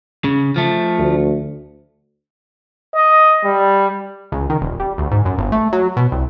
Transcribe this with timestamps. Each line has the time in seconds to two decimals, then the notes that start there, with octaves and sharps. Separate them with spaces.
0.24 C#3
0.56 F3 A3
0.98 D2
2.95 D#5
3.45 G3
4.32 C#2
4.50 D#3
4.61 D#1
4.80 G3
4.98 D2
5.11 G#2
5.25 F#2
5.38 G1
5.52 A3
5.73 F#3
5.97 B2
6.12 C2